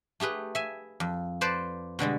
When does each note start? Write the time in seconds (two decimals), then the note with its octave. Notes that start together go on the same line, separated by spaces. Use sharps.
0.20 A3 G4 G#4 B4
0.55 E5 G#5
1.00 F2
1.41 B4 C5 D5 A5
1.99 B2 D3 G3 G#3